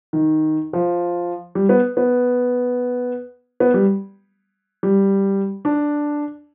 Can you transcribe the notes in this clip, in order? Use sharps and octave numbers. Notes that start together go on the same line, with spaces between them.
D#3
F3
G3
B3
B3
B3
G3
G3
D4